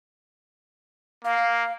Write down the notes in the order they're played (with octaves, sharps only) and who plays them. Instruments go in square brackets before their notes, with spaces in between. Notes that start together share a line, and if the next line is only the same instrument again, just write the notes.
[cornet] A#3 [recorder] F5